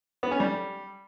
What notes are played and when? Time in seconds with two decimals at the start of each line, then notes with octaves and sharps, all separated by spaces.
0.23 B3
0.31 C#4
0.40 G3